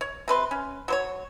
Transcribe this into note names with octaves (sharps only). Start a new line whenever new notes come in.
C#5
C3 B4 C6
C#4
F#3 C5 C#5